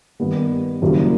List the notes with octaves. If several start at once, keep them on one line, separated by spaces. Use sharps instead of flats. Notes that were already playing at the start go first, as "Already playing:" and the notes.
G2 D#3 G3 B3
F#1 F#2 D#3 G3 A#3